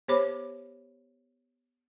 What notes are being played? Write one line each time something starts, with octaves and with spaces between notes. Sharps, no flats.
B3 G4 C5 C#5 B5 D6